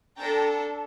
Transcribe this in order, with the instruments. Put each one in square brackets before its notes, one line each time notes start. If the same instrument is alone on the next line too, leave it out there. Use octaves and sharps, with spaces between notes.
[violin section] D4 A4 G5 A#5